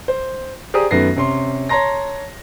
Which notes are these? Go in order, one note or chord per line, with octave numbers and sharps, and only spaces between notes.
C5
G4 G#4 C5 D5 A#5 D#6
F#2 D#3 A3 B3 A#6 C7
C3 C#4 C6
C#5 A5 A#5 C6 A#6